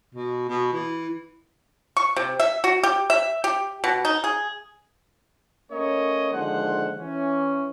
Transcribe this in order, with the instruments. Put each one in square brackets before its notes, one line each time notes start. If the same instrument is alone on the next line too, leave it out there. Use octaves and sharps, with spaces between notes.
[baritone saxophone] B2
B2
E3
[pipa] C#6
C3
E5
F#4
G4
E5
G4
B2
D#4
G#4
[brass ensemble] A3 A#3 C#4 A#4 C#5 D#5
D#2 D3 F3 G#3 C5 F#5
E3 C#4